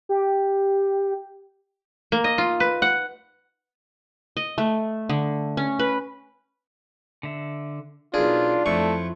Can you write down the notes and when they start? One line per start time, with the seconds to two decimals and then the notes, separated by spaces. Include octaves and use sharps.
0.09 G4
2.12 A#3
2.24 D#5
2.38 F4
2.60 B4
2.82 F#5
4.37 D#5
4.58 A3
5.09 D3
5.57 C#4
5.79 B4
7.23 D3 E5
8.14 B1 D4 F4 G#4 A#4
8.66 F2 F#3 A3 E4 F4 C#6